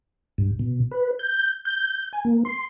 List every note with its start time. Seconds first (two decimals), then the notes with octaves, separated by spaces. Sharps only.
0.38 G2
0.59 B2
0.91 B4
1.19 G6
1.65 G6
2.13 G#5
2.25 A#3
2.45 C6